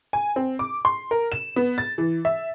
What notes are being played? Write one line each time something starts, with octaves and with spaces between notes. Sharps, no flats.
G#5
C4
D6
C6
A#4
E7
B3
A6
E3
E5